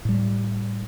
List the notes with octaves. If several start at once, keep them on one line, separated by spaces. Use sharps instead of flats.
A2 G3